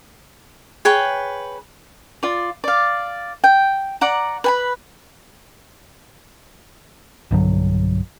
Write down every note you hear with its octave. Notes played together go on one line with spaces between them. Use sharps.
G#4 B4 C#5 G5
F4 D5
D5 F5
G5
D5 F#5 A#5
B4 G#5 B5
B1 G2 D3 F#3